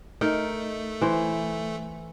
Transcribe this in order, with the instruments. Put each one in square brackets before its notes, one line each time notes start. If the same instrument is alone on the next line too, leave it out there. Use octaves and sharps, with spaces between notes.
[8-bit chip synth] A3 [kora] D#4 A#4
[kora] E3 C5